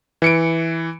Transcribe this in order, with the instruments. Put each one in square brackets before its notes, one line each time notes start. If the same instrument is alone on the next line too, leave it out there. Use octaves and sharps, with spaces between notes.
[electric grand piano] E3 C#7 D7